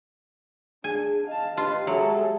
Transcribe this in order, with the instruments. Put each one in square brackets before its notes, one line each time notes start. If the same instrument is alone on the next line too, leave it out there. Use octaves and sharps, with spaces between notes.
[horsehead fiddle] D4 [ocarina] G#4 [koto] G#5
[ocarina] D#5 [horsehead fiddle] F5 A5
[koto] F4 [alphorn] G4 [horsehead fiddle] B4
[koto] F#3 [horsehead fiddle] G#3 A4 [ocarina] E5